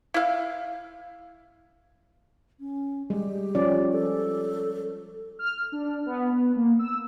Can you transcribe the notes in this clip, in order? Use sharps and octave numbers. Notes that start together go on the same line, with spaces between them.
E4 F5
C#4
G3 G#3 G4
F3 C#4 D5
A4
F6
D4
B3
B3
A#3
E6